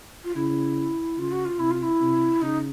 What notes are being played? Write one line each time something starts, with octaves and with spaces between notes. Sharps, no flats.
F4
C#3 E4
C#3 F4
F#4
F4
C3 E4
F4
E4
C3
C#3 D#4